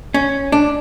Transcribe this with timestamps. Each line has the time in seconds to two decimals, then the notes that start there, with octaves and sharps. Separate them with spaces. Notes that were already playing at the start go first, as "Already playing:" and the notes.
0.14 C#4
0.52 D4